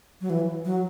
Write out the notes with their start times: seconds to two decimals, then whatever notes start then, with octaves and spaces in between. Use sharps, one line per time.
0.21 F#3
0.30 E3
0.65 F#3